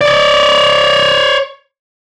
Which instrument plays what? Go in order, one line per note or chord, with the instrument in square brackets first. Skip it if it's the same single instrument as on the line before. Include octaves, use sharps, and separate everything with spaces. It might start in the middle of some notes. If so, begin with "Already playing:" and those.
[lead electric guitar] C#5 D5